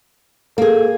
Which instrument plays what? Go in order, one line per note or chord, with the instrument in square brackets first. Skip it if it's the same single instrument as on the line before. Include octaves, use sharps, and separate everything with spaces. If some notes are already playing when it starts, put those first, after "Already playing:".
[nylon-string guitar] A#3 G#4 [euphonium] A4